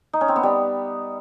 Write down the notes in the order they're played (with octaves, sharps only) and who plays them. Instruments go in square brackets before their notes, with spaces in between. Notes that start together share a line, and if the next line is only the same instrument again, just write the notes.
[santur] D#4
C#4
C4
B3
G3